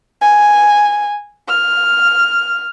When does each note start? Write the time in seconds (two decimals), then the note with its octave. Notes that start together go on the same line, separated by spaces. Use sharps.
0.22 G#5
1.49 F6